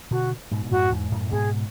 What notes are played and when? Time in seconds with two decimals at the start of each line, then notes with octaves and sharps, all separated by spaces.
0.11 B2 D3 F#4
0.51 G#2 B2
0.62 G#2
0.71 F#2 A2 F#4
0.92 E2 G#2
1.12 F#2 A2
1.31 G#2 B2 G#4